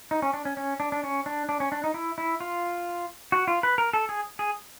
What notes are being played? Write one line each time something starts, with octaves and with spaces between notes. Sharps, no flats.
D#4
C#4
D4
C#4
C#4
D4
D4
C#4
D4
D4
C#4
D4
D#4
E4
E4
F4
F#4
F4
B4
A#4
A4
G#4
G#4